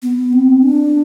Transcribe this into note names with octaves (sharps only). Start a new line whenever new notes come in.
B3
C4
D4